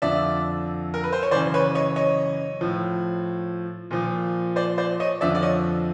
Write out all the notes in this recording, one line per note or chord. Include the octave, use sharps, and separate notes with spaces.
F2 D3 F3 D5 E5
A#4
B4
C5
C#5
F#2 C#3 E3 C5 D5
B4 C#5
C#5 D#5
C#5 D#5
A2 F3
A#2 F3
C5 D5
C5 D5
C#5 D#5
F2 D3 F3 D5 E5
D5
C#5 D#5